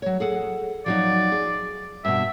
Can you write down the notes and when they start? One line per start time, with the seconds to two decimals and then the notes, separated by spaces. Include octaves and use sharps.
0.02 F#3 C#5
0.20 G#4 A4 F#5
0.86 F3 F#3 D#4 D5
1.32 G#4
2.05 G2 B2 E5